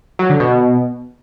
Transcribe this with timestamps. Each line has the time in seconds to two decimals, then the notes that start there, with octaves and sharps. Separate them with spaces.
0.19 F#3
0.30 D3
0.40 B2